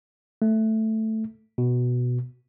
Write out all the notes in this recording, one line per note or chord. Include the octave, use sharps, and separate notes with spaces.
A3
B2